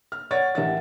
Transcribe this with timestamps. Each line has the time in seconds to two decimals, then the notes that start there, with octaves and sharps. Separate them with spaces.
0.12 F6
0.31 C#5 D5 F#5 A6
0.55 A1 G4 A#4 E5 F#5 A6